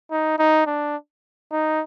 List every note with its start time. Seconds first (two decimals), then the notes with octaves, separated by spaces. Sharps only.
0.11 D#4
0.39 D#4
0.67 D4
1.52 D#4